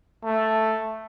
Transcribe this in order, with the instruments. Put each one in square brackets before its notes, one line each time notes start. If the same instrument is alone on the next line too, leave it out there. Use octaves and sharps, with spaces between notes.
[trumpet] A3